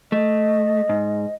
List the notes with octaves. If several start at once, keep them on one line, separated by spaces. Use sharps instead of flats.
A3 D#5
G#2